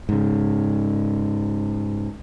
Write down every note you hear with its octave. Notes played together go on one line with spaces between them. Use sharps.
G#2 C#3